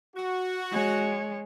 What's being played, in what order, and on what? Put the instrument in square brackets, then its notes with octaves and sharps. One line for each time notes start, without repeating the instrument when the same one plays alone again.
[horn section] F#4
[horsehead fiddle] G#3 C#5